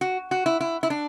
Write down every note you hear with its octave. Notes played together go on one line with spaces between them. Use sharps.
F#4
F#4
E4
E4
E4
D4